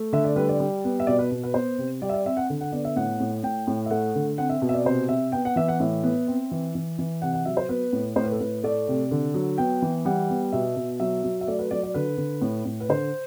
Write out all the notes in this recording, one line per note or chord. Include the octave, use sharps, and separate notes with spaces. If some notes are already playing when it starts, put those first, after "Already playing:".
Already playing: A3
D3 E5
D5
G3 B4
D5
G3
B3
E5
B2 D5
B4
B2
B4
B3 C5
C3
G3 D5
E5
D5
C4 E5
F#5
D3
F#5
B3 D5
E5
A2 F#5
A2
A2 G5
A2
E5
A3 F#5
D3
C4 F#5
E5
B2
E5
D5
C3 C5
C3 E5
B3 G5
F#5
E3 E5
F#5
A2 E5
B3
C4
E3
E3
E3
C3 F#5
F#5
F#3 E5
C5
B3 B4
A2
A2 C5
B4
A4
A2 B4
A3 D5
C3
D3
F#3
B3 G5
E3
G3 F#5
B3
B2 E5
B2
F#3 E5
F#3
E5
A3 D5
B4
F#3 D5
D5
D3 B4
D3
A2
A2
B4
D3 C5